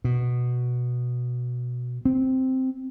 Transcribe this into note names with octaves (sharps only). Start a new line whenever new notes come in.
B2
C4